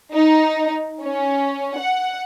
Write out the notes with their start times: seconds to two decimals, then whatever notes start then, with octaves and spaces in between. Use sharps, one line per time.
0.13 D#4
1.02 C#4
1.77 F#5